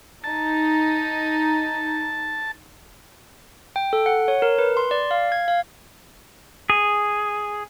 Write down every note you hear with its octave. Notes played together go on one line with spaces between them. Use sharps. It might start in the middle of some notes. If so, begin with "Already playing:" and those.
D#4 A5
G5
A4
F#5
C#5
A#4
B4
C6
D5
F5
G#6
F5
G#4